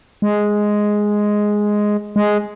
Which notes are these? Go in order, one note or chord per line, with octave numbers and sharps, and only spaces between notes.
G#3
G#3